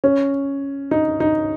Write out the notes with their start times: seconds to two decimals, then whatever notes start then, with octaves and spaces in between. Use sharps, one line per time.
0.04 C#4
0.91 D#4
1.20 D#4